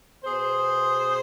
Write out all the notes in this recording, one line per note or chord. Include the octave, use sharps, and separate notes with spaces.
B2 G#4 C5